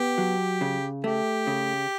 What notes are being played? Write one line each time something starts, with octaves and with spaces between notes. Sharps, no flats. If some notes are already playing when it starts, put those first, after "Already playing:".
Already playing: B3 G4
F#3
C#3
A3 G4
C#3